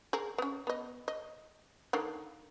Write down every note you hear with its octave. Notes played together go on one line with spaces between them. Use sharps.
G#4 A#4
B3 C#4
B3 D#5
D#5
D3 D#3 A#3